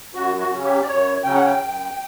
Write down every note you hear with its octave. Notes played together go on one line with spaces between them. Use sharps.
F#2 F#4
F#4
C#3 F#3 C#4
G4
D5
F#2 C#5
C#3 F#3 C#4 G5
F#5
G5
F#2